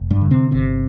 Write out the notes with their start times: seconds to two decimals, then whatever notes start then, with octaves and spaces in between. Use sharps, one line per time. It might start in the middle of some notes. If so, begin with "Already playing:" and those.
Already playing: F1
0.10 G2 G3
0.21 D3
0.31 C3 C4
0.51 G1 C3 C4